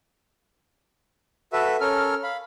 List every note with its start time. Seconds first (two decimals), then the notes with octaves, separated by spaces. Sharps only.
1.53 F#4 A4 B4 E5
1.80 C#4 A4 A#4 F6
2.23 F5 B5